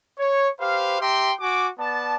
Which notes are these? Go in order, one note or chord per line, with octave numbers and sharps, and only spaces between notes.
C#5
G4 B4 C5 F5
G4 E5 G5 A#5 C6
F#4 G#5 D6
B3 D5 A5